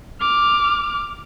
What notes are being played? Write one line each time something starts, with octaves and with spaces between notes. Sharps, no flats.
D6 F6